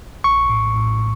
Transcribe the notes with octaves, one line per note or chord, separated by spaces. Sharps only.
A#1 C#6
A2
A2